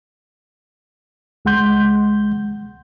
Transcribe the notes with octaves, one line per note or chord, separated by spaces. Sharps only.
C#2 G#3 F#5 C6 G6